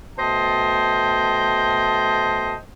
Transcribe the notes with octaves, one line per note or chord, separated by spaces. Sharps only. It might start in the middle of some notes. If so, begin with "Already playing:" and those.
B2 A3 C5 D#5 G5 A5